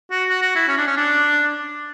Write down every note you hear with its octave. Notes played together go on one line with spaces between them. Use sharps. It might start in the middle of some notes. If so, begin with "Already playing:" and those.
F#4
F#4
F#4
E4
C#4
D4
C#4
D4